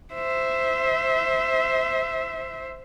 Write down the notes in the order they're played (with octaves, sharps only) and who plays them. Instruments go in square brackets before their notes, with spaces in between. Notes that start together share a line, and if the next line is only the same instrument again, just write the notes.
[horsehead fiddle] C5 E5